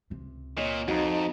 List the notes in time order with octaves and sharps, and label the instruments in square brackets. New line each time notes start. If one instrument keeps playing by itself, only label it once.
[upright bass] C#2 C3
[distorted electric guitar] A#2 [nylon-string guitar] C#5 D#5
[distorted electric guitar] F2 [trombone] D#4 [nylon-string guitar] F#4